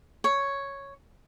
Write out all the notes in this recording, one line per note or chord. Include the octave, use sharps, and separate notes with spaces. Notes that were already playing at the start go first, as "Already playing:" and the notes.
C#5